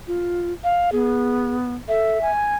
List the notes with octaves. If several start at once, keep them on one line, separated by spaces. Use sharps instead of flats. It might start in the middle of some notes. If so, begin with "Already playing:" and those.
F4
F5
B3 G#4
A4 E5
G#5